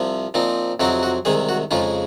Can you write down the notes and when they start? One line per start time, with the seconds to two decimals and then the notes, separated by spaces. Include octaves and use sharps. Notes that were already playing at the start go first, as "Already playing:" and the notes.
Already playing: C2 C3 F3
0.34 A#2 F3 C4 D#4
0.80 F2 C3 F#3 C4 D#4 F#4
1.03 F#4
1.25 C2 C3 D#3 G#3 G#4
1.49 F#4
1.71 F2 C#3 G#3 D#4 F4